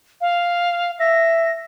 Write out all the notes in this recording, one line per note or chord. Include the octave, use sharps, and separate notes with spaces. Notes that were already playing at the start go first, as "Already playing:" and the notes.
F5
E5 A#6